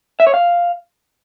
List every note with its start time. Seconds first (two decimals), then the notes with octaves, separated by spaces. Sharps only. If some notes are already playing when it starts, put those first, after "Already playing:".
0.20 E5
0.27 C#5
0.34 F5